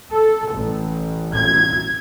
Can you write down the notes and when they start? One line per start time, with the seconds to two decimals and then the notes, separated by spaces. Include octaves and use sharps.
0.13 A4
0.54 A1
1.34 G#6